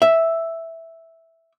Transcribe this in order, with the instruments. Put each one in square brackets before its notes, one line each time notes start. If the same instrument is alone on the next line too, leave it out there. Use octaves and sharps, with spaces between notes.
[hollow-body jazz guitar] E5